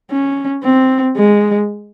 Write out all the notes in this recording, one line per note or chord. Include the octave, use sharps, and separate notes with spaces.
C#4
C4
G#3